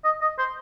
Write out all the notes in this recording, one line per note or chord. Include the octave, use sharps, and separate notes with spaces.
D#5
D#5
C5